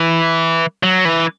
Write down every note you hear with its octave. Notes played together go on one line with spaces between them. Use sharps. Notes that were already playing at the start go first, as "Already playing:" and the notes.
Already playing: E3
F#3
E3